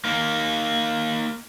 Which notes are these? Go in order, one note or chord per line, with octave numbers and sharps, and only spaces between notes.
A#3 D#4